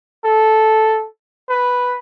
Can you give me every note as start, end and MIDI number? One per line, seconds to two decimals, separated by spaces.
0.24 1.06 69
1.50 1.98 71